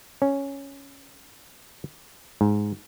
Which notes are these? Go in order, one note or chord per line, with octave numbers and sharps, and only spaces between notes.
C#4
G#2